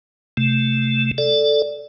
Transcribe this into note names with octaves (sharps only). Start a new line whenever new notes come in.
C3 A3
A4 D5